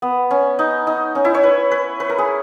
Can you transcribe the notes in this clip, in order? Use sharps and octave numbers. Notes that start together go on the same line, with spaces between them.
B3
C#4
D#4
D#4
C#4
E4
C#5
B4
B4
B4
A#4
G#4